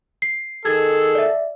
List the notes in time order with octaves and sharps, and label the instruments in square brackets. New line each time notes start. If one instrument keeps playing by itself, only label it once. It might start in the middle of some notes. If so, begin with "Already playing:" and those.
[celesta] C7
[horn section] D#3 G#4 A4 [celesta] G#6
[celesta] D5 E5